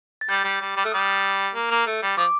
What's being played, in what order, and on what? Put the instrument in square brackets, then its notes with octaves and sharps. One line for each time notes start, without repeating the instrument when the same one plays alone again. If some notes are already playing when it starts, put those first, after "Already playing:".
[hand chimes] A6
[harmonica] G3 [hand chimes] G6
[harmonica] G3
G3
G3
[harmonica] A3 [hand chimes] F6
[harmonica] G3 [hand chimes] D#6
[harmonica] A#3
A#3
A3
G3
[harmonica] F3 [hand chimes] D6